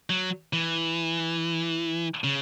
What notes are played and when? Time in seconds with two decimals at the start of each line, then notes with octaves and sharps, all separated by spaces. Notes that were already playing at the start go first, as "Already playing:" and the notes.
0.10 F#3
0.53 E3
2.24 C#3